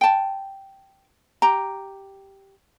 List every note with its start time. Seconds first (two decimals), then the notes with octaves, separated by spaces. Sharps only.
0.01 G5 A5
1.42 G4 A#5